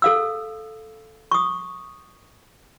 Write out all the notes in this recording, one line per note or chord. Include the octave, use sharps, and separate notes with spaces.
A4 F5 E6
C#6 D#6